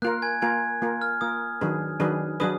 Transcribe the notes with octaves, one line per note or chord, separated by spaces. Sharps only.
A#3 F4 A#4 F#6
G#5 G#6
A#3 F4 A#4 G#5 G#6
A#3 F4 A#4
F6
A#3 F4 A#4 D#6
D#3 F#3 D4 G#4 B4
D#3 F#3 D4 G#4 B4
F#3 D4 G#4 B4 D#6